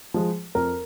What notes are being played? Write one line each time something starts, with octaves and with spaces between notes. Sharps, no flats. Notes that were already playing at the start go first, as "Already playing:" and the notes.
F3 G#3
F2 A#4